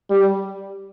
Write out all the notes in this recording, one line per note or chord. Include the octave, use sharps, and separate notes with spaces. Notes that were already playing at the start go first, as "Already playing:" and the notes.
G3